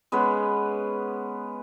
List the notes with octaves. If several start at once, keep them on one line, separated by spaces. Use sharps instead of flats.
G#3 B3 C#4 B4